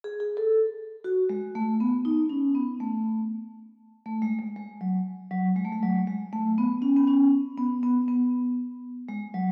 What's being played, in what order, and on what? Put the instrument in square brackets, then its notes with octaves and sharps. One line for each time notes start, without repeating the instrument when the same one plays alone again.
[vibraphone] G#4
G#4
A4
F#4
G#3
A3
B3
D#4
C#4
B3
A3
A3
G#3
G#3
G#3
F#3
F#3
G#3
A3
G#3
F#3
G#3
A3
B3
C#4
B3
C#4
B3
B3
B3
G#3
F#3